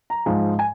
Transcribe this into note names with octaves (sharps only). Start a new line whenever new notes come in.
A#5
G#2 F3 G#3
G#5